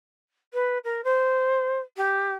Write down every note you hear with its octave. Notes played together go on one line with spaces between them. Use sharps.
B4
A#4
C5
G4